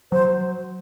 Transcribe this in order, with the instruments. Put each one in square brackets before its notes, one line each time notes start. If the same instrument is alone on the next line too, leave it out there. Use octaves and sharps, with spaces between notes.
[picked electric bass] F#3 [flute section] C5